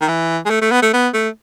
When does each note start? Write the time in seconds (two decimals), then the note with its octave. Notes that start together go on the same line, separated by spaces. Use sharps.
0.01 D#3
0.08 E3
0.46 G#3
0.50 A3
0.62 A3
0.71 B3
0.82 A3
0.93 B3
1.14 A3